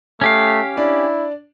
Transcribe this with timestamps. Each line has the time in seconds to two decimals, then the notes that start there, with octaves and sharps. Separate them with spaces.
0.21 A3 C#4 G4 F5
0.77 D4 E4 D5